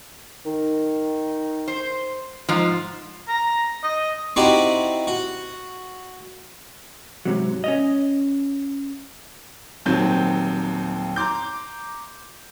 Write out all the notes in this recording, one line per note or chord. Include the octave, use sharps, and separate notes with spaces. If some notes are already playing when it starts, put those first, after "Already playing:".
D#3
C5
G#2 F3
A#5
D#5
C4 D#4 E4 F#4 G4 D5
F#4
G#2 C3 F#3
C#4 C#5 D#5
D#1 D#2 F#3 C4 G6
A#5 C6 D6 G6